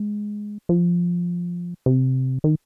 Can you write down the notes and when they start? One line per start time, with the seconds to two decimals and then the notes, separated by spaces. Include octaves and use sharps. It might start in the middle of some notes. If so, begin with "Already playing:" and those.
Already playing: G#3
0.69 F3
1.86 C3
2.44 D#3